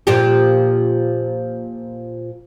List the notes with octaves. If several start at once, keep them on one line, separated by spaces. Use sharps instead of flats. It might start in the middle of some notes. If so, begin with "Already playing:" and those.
A#2 F3 G4